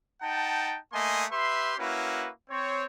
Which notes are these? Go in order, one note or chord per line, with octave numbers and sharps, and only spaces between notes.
D#4 F#5 G5 A5
A3 A#3 D#5 G#5 C6
G4 B4 E5 C6
A#3 C#4 E4 F#4 B4
C4 C#5